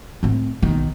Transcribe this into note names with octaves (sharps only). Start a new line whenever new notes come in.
A2 C4
B1 D#3